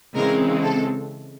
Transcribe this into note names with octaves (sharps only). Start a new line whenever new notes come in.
C#3 E3 G#3 C4 A#4
A4